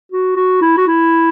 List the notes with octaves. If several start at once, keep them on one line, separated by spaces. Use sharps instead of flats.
F#4
F#4
E4
F#4
E4